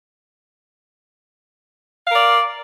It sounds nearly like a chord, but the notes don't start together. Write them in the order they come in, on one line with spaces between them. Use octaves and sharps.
F5 A#4 D5